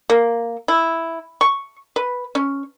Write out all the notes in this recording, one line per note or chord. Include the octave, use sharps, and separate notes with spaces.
A#3
E4
C#6
B4
C#4